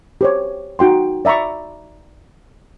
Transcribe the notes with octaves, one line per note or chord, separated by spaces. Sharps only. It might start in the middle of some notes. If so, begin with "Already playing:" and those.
G4 C5 C#5
D#4 F#4 G5 C6
D5 E5 A#5 B5 C#6